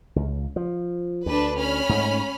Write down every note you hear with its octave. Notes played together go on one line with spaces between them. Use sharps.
C#2
F3
D2 D4 B4
C#4 B5 F6
G#2 A3